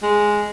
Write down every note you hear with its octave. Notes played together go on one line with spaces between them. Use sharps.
G#3